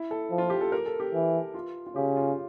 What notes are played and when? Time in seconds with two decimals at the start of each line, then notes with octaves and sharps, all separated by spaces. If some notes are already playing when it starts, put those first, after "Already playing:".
Already playing: E4
0.11 A4
0.31 F3
0.38 F4
0.50 G4
0.61 A4
0.72 A#4
0.86 A4
1.00 G4
1.14 E3
1.54 F4
1.87 F4
1.96 C#3 G4
2.16 F4